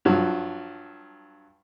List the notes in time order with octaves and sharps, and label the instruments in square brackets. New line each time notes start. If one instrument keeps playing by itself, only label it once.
[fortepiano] G2 F3 F#3